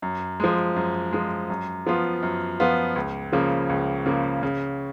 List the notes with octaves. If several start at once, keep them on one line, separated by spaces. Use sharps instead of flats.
F#2
F3 G#3
F#2
F3 G#3
F#2
F3 B3 F4
F#2
F3 B3 F4
C#2
C#3 F3 A#3
C#2
C#3 F3 A#3
C#3